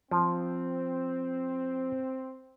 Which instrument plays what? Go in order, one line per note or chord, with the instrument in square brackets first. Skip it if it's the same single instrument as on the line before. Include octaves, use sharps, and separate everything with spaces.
[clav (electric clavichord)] F3 [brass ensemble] C4